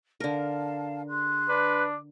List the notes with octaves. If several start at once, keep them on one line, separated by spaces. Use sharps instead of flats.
D3 A#4 F5 A5
G#4 C6 F#6
D4 B4